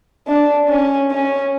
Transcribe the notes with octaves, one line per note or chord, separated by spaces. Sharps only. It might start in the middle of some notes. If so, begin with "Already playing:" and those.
D4
C#4
C#4